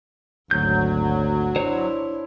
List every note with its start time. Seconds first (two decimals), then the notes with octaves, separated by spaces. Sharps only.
0.51 G#1 D2 F#3 G6
1.56 D4 E4 C5 C#5